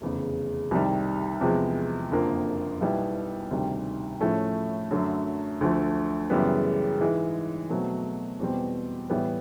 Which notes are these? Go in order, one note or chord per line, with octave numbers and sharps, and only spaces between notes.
F1 E2 C#3
C2 C3 D#3 G3
E2 C3 F3 G#3
F#1 F2 D3 F3 A#3
B1 B2 G3 B3 E4
D2 C3 D#3 G3
A2 F3 A3 C#4
F#2 D3 F#3 A3
D2 D3 F3 A3
F#2 C#3 E3 G3 B3
G#2 E3 G#3
B2 F#3 A3 C4
E2 B2 G3 C4
A2 E3 G3 B3